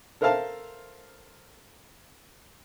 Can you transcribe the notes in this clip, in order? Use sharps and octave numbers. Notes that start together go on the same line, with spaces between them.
A4 A#4 C5 E5 F5 A5